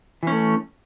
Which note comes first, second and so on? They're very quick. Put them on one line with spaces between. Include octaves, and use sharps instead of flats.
E3 C#4 A3